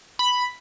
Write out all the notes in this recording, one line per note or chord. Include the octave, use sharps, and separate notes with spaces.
B5